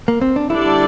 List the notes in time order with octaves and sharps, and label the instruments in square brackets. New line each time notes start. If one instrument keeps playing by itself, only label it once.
[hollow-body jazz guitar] A#3
C4
D4
[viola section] D3 G3 D4 A4 D5 [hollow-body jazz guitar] E4